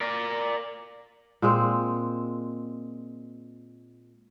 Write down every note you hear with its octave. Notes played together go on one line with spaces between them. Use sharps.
A#4 D5
A#2 G#3 C4